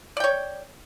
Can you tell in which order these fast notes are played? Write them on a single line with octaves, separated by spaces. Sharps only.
D5 G5 C#5